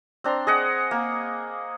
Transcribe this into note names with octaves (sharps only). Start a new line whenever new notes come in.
C4 D4 A#5 C6
G#4 D#5 F#5
A#3